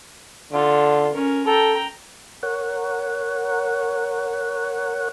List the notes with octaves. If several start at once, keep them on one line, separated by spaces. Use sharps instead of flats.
D3 F4 A4
C#4 A#4
A4 G5 A#5
A#4 C#5 F#5